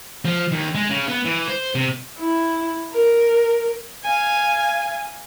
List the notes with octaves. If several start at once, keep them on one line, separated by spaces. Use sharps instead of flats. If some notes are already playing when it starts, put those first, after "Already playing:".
F3
D#2
G#3
C#3
B3
E3
C5
C3
E4
A#4
F5 G#5